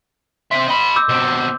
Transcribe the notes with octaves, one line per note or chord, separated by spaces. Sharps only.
C4 E5 C6
D#5 B5
D6 E6 G6
B2 C4